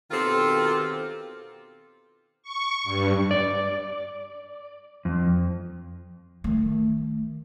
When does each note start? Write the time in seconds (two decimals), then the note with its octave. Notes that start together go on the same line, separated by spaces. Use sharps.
0.11 B2 D#3 C4 F4 G4 A4
2.43 C#6
2.84 G2
3.31 D5
5.05 F2
6.44 D#3 A3